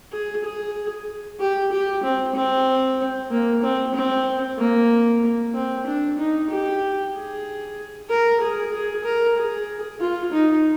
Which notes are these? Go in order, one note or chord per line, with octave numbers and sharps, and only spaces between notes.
G#4
G#4
G4
G4
C4
C4
A#3
C4
C4
A#3
C4
D4
D#4
G4
G#4
A#4
G#4
G#4
A#4
G#4
F4
D#4